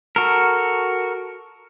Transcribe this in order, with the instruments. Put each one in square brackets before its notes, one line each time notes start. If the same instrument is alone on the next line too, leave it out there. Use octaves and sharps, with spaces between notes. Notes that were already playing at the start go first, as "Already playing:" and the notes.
[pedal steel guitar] F#4 A4 A#4